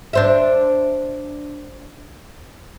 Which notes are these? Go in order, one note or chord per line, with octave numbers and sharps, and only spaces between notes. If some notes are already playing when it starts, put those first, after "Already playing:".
D4 C5 E5